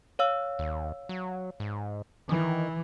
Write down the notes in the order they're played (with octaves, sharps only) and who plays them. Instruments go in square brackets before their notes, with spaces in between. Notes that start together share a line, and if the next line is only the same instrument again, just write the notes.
[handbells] C#5 F5 E6
[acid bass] D#2
F#3
G#2
[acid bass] D#3 [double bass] E3